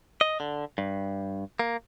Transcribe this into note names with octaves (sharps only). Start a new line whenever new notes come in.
D#5
D3
G2
A#3